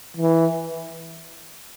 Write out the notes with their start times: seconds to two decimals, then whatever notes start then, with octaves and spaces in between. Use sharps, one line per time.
0.17 E3